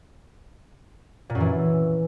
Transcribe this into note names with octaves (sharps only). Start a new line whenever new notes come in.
A#2
F#2
E3